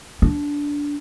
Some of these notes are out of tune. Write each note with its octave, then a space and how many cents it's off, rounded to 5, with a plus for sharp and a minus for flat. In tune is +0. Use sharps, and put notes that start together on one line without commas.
D4 -15